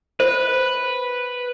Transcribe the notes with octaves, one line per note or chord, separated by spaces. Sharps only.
B4 C5